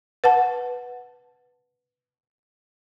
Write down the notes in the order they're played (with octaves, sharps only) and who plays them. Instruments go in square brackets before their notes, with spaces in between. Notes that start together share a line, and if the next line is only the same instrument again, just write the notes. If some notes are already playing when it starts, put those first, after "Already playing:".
[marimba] B4 F#5 A5